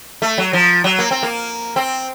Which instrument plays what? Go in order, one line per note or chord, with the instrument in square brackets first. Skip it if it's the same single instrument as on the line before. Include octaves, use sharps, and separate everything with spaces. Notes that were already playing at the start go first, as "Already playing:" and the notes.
[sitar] A3
F#3
F3
F#3
A#3
C4
A#3
C4